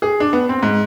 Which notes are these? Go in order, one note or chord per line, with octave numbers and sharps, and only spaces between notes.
G#4
D4
B3
C4
G#2